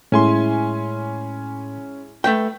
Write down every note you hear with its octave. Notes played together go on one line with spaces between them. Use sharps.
A2 G#3 C#4 E4 G#5 C6
A3 B4 G5